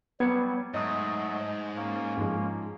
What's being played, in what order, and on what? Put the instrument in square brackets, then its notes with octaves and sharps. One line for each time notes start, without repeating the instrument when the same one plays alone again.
[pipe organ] F#3 G3 [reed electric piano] B3 [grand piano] G#6 C#7
[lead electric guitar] G#2 [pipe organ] F#3 A3 [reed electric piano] D#5 D#6
[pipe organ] A#3 C#4
[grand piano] G#2 F3 G#3